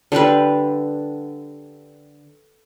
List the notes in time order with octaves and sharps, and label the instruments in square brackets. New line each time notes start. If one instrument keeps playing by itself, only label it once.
[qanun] D3 G3 D4 B4